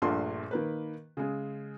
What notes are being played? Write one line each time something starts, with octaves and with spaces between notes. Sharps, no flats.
A#1 G2 A#2 A3 C6
D#3 A#3 B4
C#3 G#3